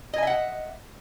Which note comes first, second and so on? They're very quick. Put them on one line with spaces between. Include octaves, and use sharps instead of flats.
D#5 G#5 E5 F#5